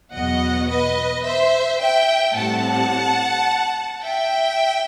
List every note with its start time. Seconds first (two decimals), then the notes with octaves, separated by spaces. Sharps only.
0.14 E2 B2 F#3 B3 D#5 F#5
0.70 B4 D#5
1.26 C5 E5
1.81 E5 G5
2.36 A2 G3 C4 F#5 A5
4.03 E5 G5